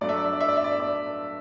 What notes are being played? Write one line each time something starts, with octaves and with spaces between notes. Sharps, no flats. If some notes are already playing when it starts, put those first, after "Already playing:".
G2 F#3 A3 D5
E5
D5
E5
D5
E5
D5
E5
D5
E5
D5